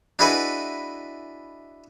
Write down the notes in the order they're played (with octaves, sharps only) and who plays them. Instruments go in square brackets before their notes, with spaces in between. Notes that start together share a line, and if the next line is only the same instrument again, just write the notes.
[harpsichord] D4 E4 F#4 G#4 B4 D#5